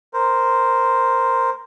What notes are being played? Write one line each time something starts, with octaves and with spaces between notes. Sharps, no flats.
A#4 C5